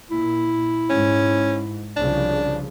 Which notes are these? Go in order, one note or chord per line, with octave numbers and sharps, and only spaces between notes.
A#2 E4
G#2 C#4
C2 C#3 F3 D4